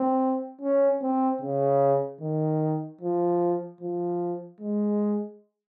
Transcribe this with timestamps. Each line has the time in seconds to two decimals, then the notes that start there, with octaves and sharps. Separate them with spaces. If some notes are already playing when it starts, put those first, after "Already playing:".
Already playing: C4
0.61 C#4
1.02 C4
1.41 C#3
2.21 D#3
3.01 F3
3.81 F3
4.60 G#3